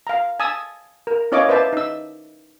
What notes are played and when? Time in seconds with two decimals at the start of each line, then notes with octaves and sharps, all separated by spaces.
0.07 F5 A#5
0.40 G#5 A5 D#6 E6
1.07 A#4
1.32 C#4 E4 C#5 D#5 F5 D6
1.49 B4 C5 D5 E5 A5
1.73 D#4 E6